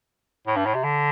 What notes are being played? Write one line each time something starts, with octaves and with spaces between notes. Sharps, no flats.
A2
G2
A2
C3
D3